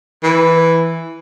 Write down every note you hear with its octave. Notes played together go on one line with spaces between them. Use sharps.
E3